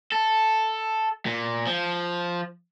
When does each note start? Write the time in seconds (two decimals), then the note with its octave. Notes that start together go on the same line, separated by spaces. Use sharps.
0.12 A4
1.26 A#2
1.67 F3